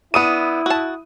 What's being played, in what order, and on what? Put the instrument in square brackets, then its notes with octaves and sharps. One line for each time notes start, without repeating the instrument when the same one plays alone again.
[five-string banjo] B3 D4 [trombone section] E4 [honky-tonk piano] D#6 D#7
[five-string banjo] F#4 A5